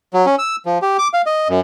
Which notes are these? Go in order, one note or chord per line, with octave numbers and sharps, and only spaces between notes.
F#3
C#4
E6
F3
G4
D6
F5
D#5
F#2